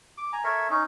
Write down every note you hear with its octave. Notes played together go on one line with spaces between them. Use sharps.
D6
G#5 A#5
A4 A#4 C#5 E5
C#4 D#4